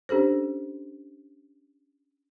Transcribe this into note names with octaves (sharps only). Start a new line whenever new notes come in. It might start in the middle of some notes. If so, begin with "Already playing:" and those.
C#4 D4 G4 A4 C5